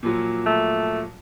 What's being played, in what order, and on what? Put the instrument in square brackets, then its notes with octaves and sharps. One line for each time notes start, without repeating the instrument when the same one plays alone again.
[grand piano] A#2 F3 F#3
[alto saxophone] A3